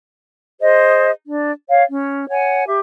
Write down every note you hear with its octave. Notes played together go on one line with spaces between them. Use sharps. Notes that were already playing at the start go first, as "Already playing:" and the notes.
G#4 C5 D#5
D4
C#5 F5
C#4
C#5 F#5 G#5
G4 E5